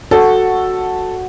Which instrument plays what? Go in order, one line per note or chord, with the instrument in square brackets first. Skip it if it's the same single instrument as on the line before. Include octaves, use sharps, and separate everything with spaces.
[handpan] F#4 [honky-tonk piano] A4